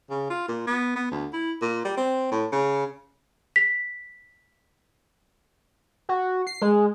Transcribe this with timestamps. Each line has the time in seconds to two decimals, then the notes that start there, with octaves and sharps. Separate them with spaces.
0.10 C#3
0.30 F4
0.48 A#2
0.67 B3
0.96 B3
1.11 D2
1.33 E4
1.62 A#2
1.85 G3
1.97 C4
2.31 A2
2.52 C#3
3.56 B6
6.09 F#4
6.47 C7
6.62 G#3